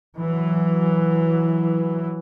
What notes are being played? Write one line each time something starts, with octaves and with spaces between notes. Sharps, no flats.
E3 F#3